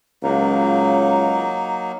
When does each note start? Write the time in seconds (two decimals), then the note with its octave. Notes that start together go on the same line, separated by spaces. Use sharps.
0.23 C#2 F#3 A#3 D#4